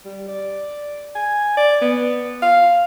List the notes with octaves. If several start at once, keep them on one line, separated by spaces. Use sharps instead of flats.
G3
D5
G#5
D5
B3
F5